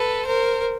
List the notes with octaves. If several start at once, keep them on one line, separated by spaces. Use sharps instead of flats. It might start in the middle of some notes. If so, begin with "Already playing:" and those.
Already playing: A4 B4
A#4 C5